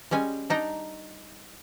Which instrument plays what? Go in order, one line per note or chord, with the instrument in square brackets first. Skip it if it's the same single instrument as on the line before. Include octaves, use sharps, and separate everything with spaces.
[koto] G3 G#3 C#4 G#5
D4 D#4 G5 A#5